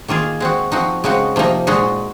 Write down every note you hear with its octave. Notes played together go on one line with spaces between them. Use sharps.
D#3 A#3 F4 G#4
G#3 C4 F#4
F3 C4 D#4 F#4
C#3 G#3 C4 D#4 F#4
C3 F3 A#3 D#4
A#2 G#3 D#4 F#4